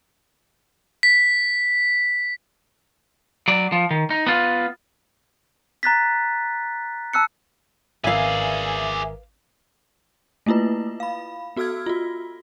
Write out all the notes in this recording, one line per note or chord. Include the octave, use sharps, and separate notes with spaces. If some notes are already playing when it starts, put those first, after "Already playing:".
B6
F#3 D5
F3
D#3
D#4
B3 F4
A#5 F#6 A6 B6
A5 E6 F#6 C#7
G#1 G#4 A#4 B4 D5 E5 F5 G#5
A3 A#3 E4 F4 B4
F5 B5
B3 F#4 A4 E6 F6 G#6
F4 F#4